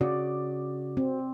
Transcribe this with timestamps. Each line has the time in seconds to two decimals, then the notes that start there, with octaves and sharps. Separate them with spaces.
0.01 C#3 F#4 D5
0.97 C4